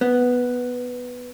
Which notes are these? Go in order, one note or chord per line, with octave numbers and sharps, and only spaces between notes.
B3